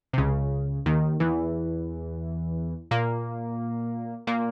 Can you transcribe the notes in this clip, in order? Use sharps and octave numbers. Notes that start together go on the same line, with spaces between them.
C3
C#2 C#3
D#2 D#3
E2 E3
A#2 A#3
A#2 A#3